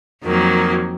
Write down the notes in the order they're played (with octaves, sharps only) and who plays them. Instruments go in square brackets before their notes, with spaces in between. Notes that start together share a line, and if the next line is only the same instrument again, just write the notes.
[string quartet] F2 D#3 F#3 A#3